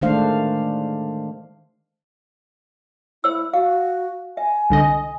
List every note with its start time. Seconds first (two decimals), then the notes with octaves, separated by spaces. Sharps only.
0.02 D#3 G#3 A3 D4 C5 F5
3.24 E4 C5 E6
3.54 F#4 F5
4.37 E5 G#5
4.70 C2 D3 D#5